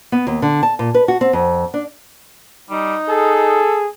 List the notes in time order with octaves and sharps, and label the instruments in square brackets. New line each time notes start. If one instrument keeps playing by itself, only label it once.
[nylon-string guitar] B3
D#2
D3
A5
A#2
B4
F#4
C4
F2
D4
[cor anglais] G3 [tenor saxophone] D#4
[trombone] G#4 [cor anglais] A4